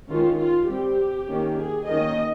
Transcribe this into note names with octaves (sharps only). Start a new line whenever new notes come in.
D#3 G#3 C#4 F4
F4
G3 C4 G4
D#3 A#3 C#4
G#4
D#3 A#3 C#4 D#5